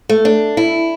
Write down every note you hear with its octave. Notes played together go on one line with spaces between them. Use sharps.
A3
D4
E4